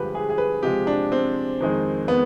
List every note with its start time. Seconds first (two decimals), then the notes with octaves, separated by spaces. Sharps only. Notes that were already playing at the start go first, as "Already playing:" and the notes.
Already playing: G2 D3 F3 G#3 G4 B4
0.15 G#4
0.29 G#4
0.38 B4
0.63 C3 F3 G#3 G4
0.87 D4
1.12 C4
1.60 F2 D#3 G#3
2.08 B3